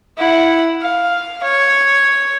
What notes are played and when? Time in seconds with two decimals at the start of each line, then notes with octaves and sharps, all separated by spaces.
0.18 E4 F#5
0.82 F5
1.43 C#5